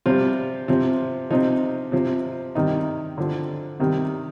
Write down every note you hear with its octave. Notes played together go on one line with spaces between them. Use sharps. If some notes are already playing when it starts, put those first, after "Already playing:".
C3 F3 G3 F4
C3 F3
C3 F3 D#4
C3 F3
C3 D#3 G3 D#4
D3 F3
C3 D#3 G3